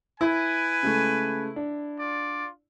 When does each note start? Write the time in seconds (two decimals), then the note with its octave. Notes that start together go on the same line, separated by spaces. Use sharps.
0.21 E4 B4 G#5
0.83 C#3 G#3 A3
1.56 D4
2.00 F4 D5